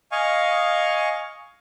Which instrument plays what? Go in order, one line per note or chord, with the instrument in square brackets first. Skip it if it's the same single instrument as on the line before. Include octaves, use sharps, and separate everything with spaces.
[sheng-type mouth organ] D#5 F5 G#5 C#6